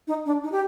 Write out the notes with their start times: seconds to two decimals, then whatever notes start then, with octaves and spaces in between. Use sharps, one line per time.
0.07 D#4
0.26 D4
0.43 D#4
0.52 G4